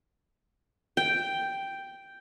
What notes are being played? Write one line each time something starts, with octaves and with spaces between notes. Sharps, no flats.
G5